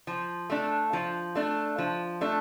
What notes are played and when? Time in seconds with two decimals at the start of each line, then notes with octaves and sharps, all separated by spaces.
0.07 F3
0.50 A3 D4
0.93 F3
1.35 A3 D4
1.78 F3
2.21 A3 D4